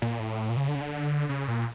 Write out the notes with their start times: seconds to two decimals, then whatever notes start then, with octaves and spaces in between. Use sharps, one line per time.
0.02 A#2
0.19 A2
0.49 A#2
0.57 C#3
0.68 D3
0.75 C#3
0.81 D3
1.29 C#3
1.48 A#2